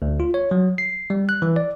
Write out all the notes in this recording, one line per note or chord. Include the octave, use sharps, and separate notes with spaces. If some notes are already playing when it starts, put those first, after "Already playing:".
D2
F4
C#5
F#3
C7
G3
F#6
E3
D5